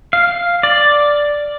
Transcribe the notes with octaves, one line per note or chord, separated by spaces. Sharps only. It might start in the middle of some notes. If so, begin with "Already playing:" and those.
F5
D5